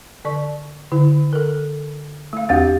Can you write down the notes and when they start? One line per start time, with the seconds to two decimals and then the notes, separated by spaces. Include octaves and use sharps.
0.25 D3 D5 C#6
0.92 D3 E4
1.33 A4 A#4
2.33 A3 F5
2.49 E2 C4 F#4 G4 F5 A6